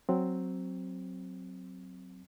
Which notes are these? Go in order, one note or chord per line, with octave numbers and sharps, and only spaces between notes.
F#3 C4